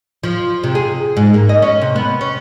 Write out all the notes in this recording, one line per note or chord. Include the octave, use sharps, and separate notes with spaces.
F3
C3
G#4
G#2
A#3
D#5
C#4
C3
B3
C#4